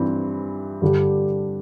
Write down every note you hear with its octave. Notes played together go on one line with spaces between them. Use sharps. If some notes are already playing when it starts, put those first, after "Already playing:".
Already playing: G2 E3 G3 C4
G2 D3 G3 D4 G4